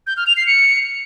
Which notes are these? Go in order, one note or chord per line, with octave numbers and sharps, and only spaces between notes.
G6
F6
F7
C7
C#7